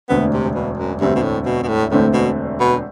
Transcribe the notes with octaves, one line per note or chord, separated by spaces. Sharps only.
E1 D2 D3 A3 B3 C4
C3
B2
F#2
E1 D2 G2 D3 A3 C4
B2
A2
B2
B2
A2
E1 D2 A2 D3 A3 C4
B2
B2